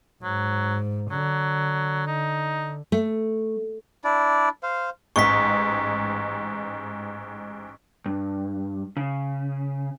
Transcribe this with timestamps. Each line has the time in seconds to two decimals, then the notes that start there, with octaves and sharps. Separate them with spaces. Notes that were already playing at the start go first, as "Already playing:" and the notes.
0.23 G#2 F#3
1.11 D3 F#3
2.07 D#4
2.92 A3
4.04 D4 E4 D5
4.63 C5 F5
5.16 A1 G#2 C#6 B6
8.06 G2
8.97 C#3